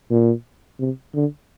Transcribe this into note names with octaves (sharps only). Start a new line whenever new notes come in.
A#2
C3
D3